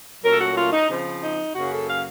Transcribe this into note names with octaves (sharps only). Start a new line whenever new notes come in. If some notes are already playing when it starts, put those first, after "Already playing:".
A#2 F#3 A3 C#4 A#4
A4
F#4
F4
D#4
C#3 F3 C4
D#4
F#2 C#3 F#3 A#3 C#4 F#4
A4
F5